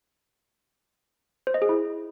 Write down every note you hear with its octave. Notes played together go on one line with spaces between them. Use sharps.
C5
D#5
G#4
E4